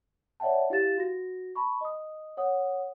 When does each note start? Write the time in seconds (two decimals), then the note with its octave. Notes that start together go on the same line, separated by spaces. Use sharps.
0.40 C#5 D5 E5 F#5 G5 A5
0.70 E4 G4 F5 A6 E7
0.98 F#4 A#6
1.55 A5 B5 C#6
1.81 D#5 D#6
2.37 C#5 F#5 D#6